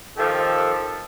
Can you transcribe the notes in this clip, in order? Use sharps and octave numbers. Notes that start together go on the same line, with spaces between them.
D#3 F3 G4 A4